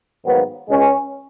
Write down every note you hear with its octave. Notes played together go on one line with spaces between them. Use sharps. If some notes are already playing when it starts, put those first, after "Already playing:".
G#2 D#3 F#3 A#3 B3
C#2 B2 G#3 C#4